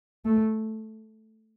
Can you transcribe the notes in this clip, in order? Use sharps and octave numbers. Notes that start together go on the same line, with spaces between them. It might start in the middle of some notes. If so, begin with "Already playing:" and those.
A3